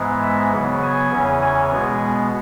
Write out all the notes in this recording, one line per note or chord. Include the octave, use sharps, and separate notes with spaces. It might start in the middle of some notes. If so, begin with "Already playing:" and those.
Already playing: G#2 E3 G#3 B3
E5
C#3 F#3 B3
G#5
E2 C#3 E3 C#4
G#5
B2 G#3 B3